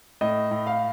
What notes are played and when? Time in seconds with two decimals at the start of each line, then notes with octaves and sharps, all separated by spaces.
0.21 A2 D#5
0.51 A2
0.67 F5